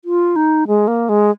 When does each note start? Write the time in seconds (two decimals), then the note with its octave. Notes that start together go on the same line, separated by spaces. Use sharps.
0.05 F4
0.36 D#4
0.68 G#3
0.88 A#3
1.09 G#3